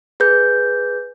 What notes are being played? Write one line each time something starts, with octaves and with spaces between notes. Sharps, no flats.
G#4 B4 G6